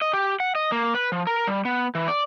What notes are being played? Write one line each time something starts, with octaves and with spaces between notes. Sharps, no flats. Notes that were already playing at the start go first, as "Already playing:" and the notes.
D#5
G4
F#5
D#5
A#3
B4
F3
A#4
G3
B3
E3
D5